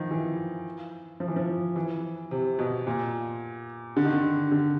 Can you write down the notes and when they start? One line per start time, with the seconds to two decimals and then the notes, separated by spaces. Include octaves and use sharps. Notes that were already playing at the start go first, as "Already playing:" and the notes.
Already playing: D#3 F3
0.11 E3
1.20 F3
1.28 E3
1.36 F3
1.76 E3
2.31 C3
2.59 B2
2.87 A#2
3.96 D3
4.05 D#3
4.13 D3
4.51 D3